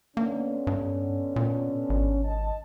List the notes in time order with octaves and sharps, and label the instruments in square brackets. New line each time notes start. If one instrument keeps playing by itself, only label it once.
[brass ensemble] D3 B3 C#4 [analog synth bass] A#3
[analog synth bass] G2
A#2
G#1
[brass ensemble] D#5 A5